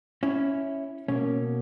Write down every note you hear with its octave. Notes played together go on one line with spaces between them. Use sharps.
C#4 E4
B2 A#3 C#4